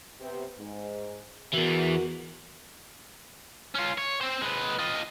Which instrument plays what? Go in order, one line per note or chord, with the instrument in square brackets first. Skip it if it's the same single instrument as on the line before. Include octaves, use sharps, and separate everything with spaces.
[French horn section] C3 B3 C4
G#2
[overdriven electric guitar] E2 E3 [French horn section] F#4 A#4
[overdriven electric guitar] C#4 F4
C#5
C4 C5
G#3 B4
F4 D#5